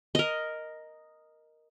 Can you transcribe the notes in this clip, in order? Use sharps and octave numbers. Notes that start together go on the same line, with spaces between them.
A#4 D#5